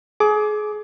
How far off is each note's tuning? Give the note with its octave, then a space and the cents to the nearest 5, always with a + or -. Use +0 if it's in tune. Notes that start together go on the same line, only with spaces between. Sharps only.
G#4 +30 D6 +0